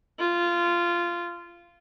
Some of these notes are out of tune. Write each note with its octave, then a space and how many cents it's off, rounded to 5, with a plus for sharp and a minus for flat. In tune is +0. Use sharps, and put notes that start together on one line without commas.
F4 -15